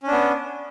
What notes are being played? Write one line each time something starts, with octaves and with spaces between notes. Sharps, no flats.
B3 C#4 D4